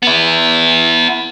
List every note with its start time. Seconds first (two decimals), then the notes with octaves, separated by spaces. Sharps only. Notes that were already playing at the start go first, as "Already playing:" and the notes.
0.03 B3 E4